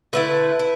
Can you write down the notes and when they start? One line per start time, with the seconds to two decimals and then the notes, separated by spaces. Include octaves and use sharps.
0.13 D3 A3 E4 B4
0.59 E4